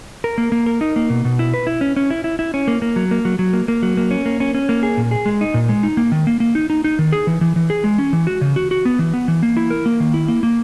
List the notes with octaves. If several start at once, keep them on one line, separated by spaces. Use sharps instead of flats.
A#4
A#3
A#3
A#4
D#4
A#3
B2
B2
E4
B4
E4
C#4
C#4
E4
E4
E4
C#4
A#3
A#3
F#3
A#3
F#3
F#3
A#3
A#3
F#3
A#3
C#4
A#3
C#4
C#4
A#3
G#4
A#2
G#4
G#3
D#4
A#2
G#3
D#4
A#3
D#3
A#3
A#3
D#4
D#4
D#4
D#3
G#4
E3
E3
E3
G#4
G#3
C#4
E3
F#4
C#3
F#4
F#4
B3
E3
B3
E3
A#3
E4
A#4
A#3
D#3
E4
A#3
A#3